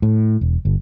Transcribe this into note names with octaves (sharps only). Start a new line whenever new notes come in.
A2
E1
G1